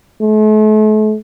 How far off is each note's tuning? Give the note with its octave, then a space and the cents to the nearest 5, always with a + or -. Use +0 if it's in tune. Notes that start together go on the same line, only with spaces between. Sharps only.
A3 -40